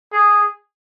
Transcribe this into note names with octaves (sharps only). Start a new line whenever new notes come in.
G#4